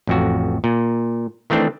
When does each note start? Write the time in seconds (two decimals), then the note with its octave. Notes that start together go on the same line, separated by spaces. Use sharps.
0.07 A1 F2 F#4
0.64 A#2
1.50 D#3 E3 A3 C4 D4